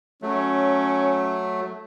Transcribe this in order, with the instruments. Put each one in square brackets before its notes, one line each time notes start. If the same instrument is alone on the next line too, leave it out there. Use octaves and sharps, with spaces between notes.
[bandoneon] F#3 A3 [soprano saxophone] C#4